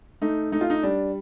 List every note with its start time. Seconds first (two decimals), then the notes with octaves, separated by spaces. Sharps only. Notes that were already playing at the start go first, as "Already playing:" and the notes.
0.22 A3 D#4
0.52 A3 D#4
0.61 F4
0.70 D#4
0.83 G3 D4